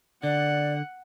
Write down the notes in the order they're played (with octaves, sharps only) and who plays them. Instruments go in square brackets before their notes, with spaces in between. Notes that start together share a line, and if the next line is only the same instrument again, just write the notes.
[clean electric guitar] D3 [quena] D5 [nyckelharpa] F#5